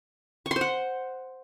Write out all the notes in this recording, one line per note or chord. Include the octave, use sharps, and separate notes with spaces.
C#6
C6
C5
F#5